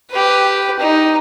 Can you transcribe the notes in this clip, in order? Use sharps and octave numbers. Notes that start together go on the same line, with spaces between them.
G4 B4
D#4